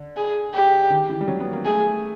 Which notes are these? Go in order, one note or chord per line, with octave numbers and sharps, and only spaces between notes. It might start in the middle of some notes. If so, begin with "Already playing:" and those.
Already playing: D3
G#4
G4
D#3
E3
G3
F#3
B3
A#3
A3 G#4